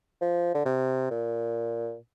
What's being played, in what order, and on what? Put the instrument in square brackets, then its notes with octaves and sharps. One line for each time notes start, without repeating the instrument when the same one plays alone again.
[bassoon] F3
D3
C3
A#2